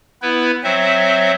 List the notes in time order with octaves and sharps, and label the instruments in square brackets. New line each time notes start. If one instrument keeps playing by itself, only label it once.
[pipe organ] B3 E4 B4
F#3 C4 C5 E5